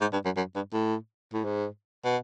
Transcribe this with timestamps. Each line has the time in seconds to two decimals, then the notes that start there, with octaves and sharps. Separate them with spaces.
0.01 G#2
0.13 G2
0.25 F#2
0.37 F#2
0.55 G2
0.73 A2
1.33 A2
1.44 G#2
2.05 B2